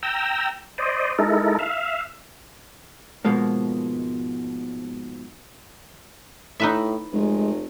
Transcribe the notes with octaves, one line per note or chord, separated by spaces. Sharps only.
G5 A#5 E6
C5 D5 D#5
G#3 D#4 E4 A4 A#4
E5 F5
G#2 B2 F3 G#3 A#3
A2 D#4 B4 E5
F1 G#3